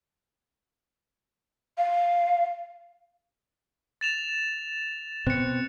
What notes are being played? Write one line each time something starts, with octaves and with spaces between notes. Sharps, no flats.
F5
A6 E7 F7
B2 C4 F#6 C#7